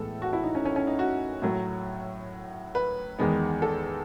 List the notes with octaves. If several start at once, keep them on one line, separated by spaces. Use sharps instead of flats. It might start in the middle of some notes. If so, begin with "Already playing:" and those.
Already playing: A2 E3 G#3 B3 A4
F#4
E4
D#4
C#4
C#4
C#4
D#4
F#4
A2 F#3 A3
B4
E2 D#3 G#3 B3
A4